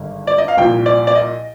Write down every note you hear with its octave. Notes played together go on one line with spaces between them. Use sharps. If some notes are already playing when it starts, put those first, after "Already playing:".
Already playing: G#1 G2 D3
D5
D#5
F5
C2 A#2 F3 G5
D5
D5
D#5